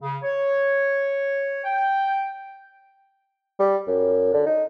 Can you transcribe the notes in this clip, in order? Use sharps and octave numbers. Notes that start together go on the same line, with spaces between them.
C#3
C#5
G5
G3
F#2
D3
D#4